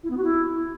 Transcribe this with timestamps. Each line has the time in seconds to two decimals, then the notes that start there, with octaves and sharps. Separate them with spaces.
0.03 E4
0.10 B3
0.17 F#4
0.24 E4